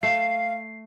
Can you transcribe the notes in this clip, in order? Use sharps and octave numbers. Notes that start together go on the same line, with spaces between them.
A3 F5 C7